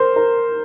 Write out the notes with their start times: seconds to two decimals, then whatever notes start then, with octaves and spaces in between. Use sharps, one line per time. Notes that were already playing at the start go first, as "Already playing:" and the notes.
Already playing: A#4 C5
0.16 A#4